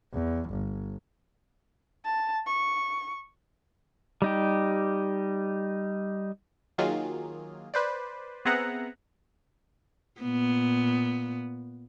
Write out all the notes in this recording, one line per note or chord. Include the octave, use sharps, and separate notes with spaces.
E2
G1
A5
C#6
G3 D#4 G4
D#3 F#3 A#3 F4 G#4
B4 C5 D5
B3 C4 G#4 E5 F#5 A#5
A#2 B3